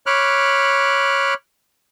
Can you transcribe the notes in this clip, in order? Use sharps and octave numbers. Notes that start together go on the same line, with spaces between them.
C#5 B5 D6 F6 F#6